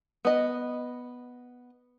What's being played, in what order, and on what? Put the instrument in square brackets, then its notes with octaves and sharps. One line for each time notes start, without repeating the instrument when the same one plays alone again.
[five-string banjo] B3 D#5